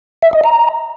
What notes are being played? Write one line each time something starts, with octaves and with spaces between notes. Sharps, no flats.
E5
D#5
A#5